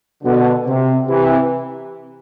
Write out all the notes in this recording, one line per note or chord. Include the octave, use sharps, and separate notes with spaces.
B2 D3
C3
C3 E3